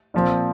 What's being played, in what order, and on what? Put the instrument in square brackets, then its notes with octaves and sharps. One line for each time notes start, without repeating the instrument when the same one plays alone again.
[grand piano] A#2 F3 C4